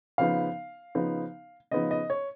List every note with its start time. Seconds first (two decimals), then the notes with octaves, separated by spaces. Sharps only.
0.18 C#3 F3 B3 D#4 F5
0.95 C#3 F3 B3 D#4
1.71 C#3 F3 B3 D#4 D#5
1.91 D#5
2.10 C#5